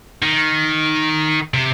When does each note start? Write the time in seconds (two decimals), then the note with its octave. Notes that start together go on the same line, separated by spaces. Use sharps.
0.22 D#3
1.54 C3